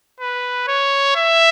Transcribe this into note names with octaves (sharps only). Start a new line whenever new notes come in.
B4
C#5
E5